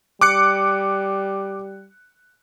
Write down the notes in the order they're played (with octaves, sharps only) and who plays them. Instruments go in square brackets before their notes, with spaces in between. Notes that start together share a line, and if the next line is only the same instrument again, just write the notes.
[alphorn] G3 [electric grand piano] D6 F#6 C#7